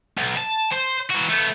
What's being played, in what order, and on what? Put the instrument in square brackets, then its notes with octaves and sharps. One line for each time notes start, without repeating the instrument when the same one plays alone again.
[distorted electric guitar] B1
A5
C5
E3 F#4
A3 B3